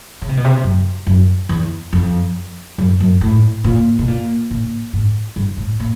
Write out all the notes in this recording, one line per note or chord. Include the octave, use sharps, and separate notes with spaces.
C#3
C3
B2
C3
F#2
F#2
E2
F2
F#2
F#2
A2
A#2
B2
A#2
A#2
G#2
G2
A2
A#2